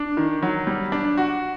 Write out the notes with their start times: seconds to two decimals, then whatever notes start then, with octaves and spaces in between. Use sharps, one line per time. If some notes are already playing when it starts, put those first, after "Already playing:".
Already playing: D4
0.17 D#3
0.43 F#3
0.67 G3
0.92 D4
1.17 F#4